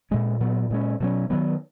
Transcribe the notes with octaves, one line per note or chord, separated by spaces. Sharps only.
A#2 G#3 C#4
A#2 F#3 B3
A#2 G#3 C#4
B2 F#3 C#4
D#3 F#3 B3